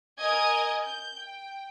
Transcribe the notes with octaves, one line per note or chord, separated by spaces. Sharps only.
A#4 D#5 G#5 G#6
G6
G5